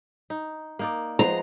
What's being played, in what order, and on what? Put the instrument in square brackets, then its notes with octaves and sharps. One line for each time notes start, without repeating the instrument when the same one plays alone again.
[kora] D#4
A#3 D#4 D5
[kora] F3 G#3 B3 [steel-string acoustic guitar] A#5